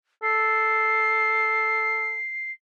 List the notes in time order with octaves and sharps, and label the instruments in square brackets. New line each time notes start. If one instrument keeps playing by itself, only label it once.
[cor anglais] A4 [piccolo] C7